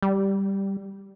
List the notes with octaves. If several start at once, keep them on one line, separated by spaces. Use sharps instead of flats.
G3